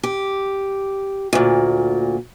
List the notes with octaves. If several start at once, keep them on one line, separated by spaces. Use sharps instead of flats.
G4
D2 A#2